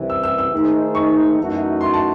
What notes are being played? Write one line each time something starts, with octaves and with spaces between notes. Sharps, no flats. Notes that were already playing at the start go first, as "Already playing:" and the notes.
Already playing: C2 C3 E3
E6
E6
E6
D#3 A3 D#4 G#4 C5
C#6
F#2 E3 A3 D#4 F#4
C6
A5